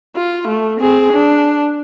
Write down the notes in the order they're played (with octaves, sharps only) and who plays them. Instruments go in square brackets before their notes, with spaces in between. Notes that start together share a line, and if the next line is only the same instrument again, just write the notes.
[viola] F4
A3
C4 G#4
D4